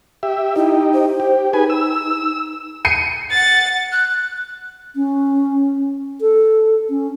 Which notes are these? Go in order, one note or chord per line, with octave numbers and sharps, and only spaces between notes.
G4 E5
D#4 E4 G4
C5
G4
D#4 G#4 B4 G#5
E6
C7 C#7 D#7
F#5 A6
F#6
C#4
A4
C#4